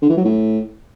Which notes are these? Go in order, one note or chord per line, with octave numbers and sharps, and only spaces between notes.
D3
E3
F#3
A2